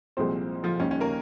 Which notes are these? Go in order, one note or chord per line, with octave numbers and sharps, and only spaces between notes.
C2 A#2 F3 G#3 C4 C5
F3 F4
D#2 D#3 G3 C#4
C#4
A#3 A#4